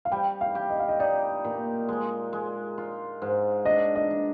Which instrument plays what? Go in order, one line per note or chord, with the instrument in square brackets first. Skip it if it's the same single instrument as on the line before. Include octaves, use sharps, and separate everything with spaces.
[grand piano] F5
[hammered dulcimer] G3 [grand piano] G5
[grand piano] F5
[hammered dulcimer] G4
[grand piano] D#5
F5
D#5
[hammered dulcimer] D#4 [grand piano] D5
[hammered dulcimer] A#2
G#3
G#3
F4
G#2
[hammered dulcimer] D4 [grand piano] D#5
[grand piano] D#5
[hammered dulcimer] D4